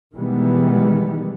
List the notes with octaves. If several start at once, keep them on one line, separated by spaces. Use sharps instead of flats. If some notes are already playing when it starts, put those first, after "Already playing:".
B2 D#3 E3 G3 G#3 B3